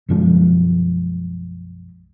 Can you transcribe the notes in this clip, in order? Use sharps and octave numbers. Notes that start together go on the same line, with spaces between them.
B1 F#2 F3 G#3